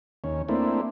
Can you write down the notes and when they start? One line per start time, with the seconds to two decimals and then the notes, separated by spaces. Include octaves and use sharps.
0.24 D#2 C#4
0.49 A3 A#3 C4 D4 E4